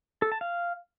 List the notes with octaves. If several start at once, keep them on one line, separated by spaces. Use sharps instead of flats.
A4
A5
F5